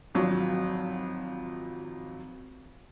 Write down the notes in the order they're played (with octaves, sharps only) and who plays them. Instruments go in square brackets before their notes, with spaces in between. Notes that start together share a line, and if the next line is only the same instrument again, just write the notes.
[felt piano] G#1 F3 F#3